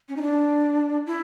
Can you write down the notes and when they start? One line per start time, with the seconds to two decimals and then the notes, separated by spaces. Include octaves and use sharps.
0.09 C#4
0.17 D#4
0.22 D4
1.07 E4